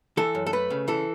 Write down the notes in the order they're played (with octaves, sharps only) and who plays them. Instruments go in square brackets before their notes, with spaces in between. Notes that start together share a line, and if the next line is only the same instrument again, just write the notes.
[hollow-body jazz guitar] E3 A4
F#2
A4
A3 B4
C#3
E3 A4